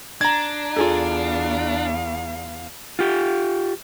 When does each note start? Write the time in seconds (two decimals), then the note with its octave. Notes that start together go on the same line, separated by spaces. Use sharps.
0.21 D4 A#5 G#6
0.76 E2 F4 G#4 A4 F5
2.99 F4 G4